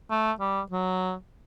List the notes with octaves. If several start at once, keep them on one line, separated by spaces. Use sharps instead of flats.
A3
G3
F#3